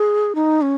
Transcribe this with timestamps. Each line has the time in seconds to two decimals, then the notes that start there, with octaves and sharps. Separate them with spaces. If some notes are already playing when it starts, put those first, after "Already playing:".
Already playing: G#4
0.35 D#4
0.62 C#4